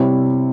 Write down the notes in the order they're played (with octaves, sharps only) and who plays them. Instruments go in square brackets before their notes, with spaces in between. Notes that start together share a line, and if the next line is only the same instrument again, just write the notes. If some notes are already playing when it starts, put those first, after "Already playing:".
Already playing: [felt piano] C3 G3 C4 E4 C#5